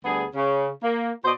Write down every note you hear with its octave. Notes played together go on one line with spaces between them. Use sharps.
D2 G3 B3 G#4
C#3
A#3
B2 F#4 C5 D5 D#5